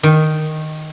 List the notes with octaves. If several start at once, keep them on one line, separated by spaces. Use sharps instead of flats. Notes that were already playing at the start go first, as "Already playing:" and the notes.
D#3